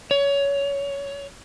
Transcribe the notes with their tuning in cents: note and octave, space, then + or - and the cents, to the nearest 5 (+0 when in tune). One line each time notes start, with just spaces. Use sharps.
C#5 +20